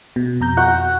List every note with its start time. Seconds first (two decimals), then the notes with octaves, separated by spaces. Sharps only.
0.16 B2
0.41 F2 A#5 G6
0.57 F#4 F#5